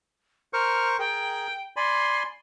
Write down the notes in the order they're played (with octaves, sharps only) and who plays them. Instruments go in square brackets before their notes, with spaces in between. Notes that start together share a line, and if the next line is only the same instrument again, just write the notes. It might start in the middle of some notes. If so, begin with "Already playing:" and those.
[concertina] A#4 C5 C#6 [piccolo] F6
[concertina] G#4 A#4 [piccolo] G5
[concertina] D5 G#5 B5 [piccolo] C6